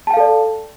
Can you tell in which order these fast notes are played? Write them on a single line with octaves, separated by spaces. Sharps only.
A5 G5 F5 A4 D5